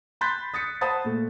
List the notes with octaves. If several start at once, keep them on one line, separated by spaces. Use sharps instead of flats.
B5 C6 F#6 G6 A6 B6
D#6 A6 B6 C#7
C5 F#5 A5 B5 D#6 A6
A#2 A3